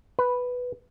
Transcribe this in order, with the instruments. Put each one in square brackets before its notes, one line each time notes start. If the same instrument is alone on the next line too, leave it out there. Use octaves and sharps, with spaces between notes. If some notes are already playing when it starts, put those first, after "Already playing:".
[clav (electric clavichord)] B4